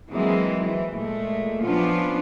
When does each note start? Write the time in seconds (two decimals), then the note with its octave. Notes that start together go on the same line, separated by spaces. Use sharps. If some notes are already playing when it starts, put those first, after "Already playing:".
0.11 E3 F#3 G#3 A#3 C4
0.61 E3
0.96 A#2 G#3 A3
1.63 F3 B3 C#4 D4 F4